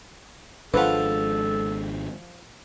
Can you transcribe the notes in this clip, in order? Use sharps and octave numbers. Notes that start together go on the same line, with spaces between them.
G#1 F3 G#3 D4 F4 A4 B4 F#5